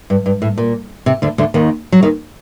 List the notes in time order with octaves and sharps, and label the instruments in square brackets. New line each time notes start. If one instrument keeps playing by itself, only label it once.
[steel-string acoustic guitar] G2
G2
A2
A#2
C3
D2 D3
D2 D3
D#2 D#3
F#3
D#2 D#3